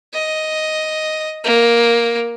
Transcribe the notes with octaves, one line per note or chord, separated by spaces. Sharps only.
D#5
A#3